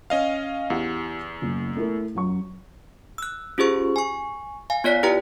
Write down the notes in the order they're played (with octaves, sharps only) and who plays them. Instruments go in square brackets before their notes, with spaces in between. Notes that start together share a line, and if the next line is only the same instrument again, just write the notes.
[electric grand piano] C#4 D#5 F5
[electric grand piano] E2 [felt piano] E4 G4 F#5
[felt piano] F#1
A3 E4 A#4
F#2 F#3 C#6
[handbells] E6 F#6
C#4 F4 G4 G#4 C5 C#6
G#5 C#6
F5 G#5
B3 F4 C#5 D5 B6
E4 G4 B4 G5 A#5